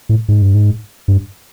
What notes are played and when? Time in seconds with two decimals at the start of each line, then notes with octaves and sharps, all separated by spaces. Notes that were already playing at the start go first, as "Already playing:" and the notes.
0.09 A2
0.28 G#2
0.42 G2
0.54 G#2
1.08 G2